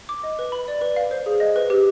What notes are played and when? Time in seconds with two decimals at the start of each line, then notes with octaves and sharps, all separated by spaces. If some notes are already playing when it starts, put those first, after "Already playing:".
0.09 D6
0.23 D#5
0.39 B4
0.52 B5
0.68 D5
0.82 B4
0.96 F5
1.11 C5
1.26 G#4
1.40 D#5
1.56 B4
1.70 G4